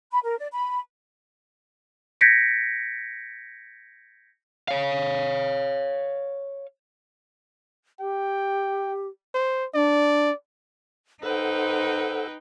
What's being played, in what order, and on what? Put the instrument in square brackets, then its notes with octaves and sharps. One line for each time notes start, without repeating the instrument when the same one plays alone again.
[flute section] B5
A#4
D5
B5
[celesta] G6 G#6 A#6 B6 C#7 D7
[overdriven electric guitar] C#5 F5
[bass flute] G4 [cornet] G5
[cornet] C5
[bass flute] D4 [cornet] D5
[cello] D#4 [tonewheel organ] A4 F#5 E6 [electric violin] B4 G5 [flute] C5